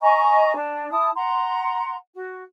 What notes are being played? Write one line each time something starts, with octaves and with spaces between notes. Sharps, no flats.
D#5 G#5 A#5 C#6
D4
E4 A5 D#6
F#5 A#5 C6
F#4